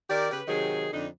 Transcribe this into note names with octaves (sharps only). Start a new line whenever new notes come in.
D#3 G4 A#4 D5
C#3 G4 B4
C3 D#3 F#3 G#4
F2 D3 D4 D#4